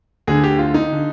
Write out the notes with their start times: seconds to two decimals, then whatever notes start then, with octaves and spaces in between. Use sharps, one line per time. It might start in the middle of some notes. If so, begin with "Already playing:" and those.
0.27 D2 D3 G#4
0.44 G4
0.59 F4
0.74 D#4
0.92 D3